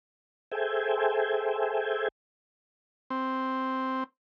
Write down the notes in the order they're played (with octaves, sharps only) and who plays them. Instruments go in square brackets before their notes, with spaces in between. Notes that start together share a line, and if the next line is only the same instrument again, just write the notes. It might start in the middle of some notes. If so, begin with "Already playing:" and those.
[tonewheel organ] G#4 A4 C5 E5 G5 G#5
[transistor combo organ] C4